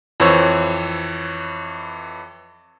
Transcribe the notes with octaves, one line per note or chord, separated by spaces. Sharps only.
F2 E3 C5 C#5 E6